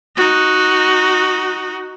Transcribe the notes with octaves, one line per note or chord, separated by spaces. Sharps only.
D#4 F#4